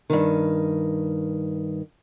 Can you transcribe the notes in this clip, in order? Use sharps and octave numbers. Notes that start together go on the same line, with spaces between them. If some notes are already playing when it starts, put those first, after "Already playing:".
G2 D#3